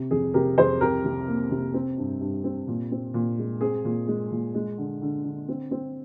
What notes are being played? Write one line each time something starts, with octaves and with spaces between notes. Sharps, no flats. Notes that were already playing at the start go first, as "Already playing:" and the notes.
Already playing: C3
F2 G#4
C3 G4 A#4
F2 G#4 C5
C2 G4 A#4
C3
A#3
C3
C4
G2
G2
C4
A#2
C4
A#2
G#3
C4 G#4
A#2
G#3
A#2
G#3
D3
D3
D3
C4
C4